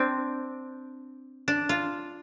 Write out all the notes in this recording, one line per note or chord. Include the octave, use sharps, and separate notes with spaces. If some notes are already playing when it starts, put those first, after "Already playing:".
Already playing: C4 D4
D4
F4